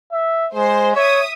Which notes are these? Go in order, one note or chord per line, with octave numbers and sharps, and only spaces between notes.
E5
G#3 C5
C#5 E5 D#6